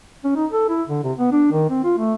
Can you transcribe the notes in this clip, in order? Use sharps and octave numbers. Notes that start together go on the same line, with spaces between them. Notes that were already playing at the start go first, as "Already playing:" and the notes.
C#4
D#4
A4
E4
D3
C3
B3
D4
D#3
C4
F4
A3